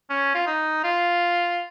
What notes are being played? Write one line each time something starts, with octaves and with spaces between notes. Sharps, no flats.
C#4
F4
D#4
F4